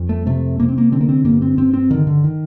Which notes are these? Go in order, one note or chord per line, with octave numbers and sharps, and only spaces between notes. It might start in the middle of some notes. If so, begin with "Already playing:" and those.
Already playing: F2
A3
C3 A3
C3 A#3
C4
A#3
D3 C4
A#3
C4
G2 A#3
C4
G2 C4
C4
D3 D#3
D3
D#3